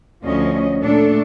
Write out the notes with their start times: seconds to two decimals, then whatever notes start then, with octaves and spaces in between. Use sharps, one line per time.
0.23 D2 F3 C#4 D#5
0.81 A#2 A3 D4 A4